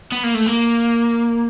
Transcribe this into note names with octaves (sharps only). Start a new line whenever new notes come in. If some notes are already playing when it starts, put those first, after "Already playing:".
B3
A#3
A3
A#3